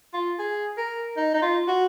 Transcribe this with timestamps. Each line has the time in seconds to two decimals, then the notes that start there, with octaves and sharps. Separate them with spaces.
0.14 F4
0.39 G#4
0.78 A#4
1.17 D#4
1.34 D#4
1.42 F4
1.68 F#4